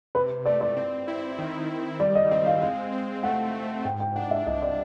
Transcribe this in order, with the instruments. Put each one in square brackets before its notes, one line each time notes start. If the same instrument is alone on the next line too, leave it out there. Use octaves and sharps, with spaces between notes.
[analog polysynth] C3 [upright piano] B4
[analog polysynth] A3 [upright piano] D5
[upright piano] D5
[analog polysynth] C4
E4
D#3
D#3
[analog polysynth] G3 [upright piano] D5
[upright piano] D#5
[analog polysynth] C4 [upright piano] D#5
[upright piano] F5
[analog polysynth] G#3 [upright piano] F5
[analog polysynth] C4
[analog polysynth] A3 [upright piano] F#5
[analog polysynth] A3
[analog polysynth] G#2 [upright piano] G5
[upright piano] G5
[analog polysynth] D4 [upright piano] F#5
[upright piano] E5
[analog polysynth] C2 [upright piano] D#5
[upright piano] D5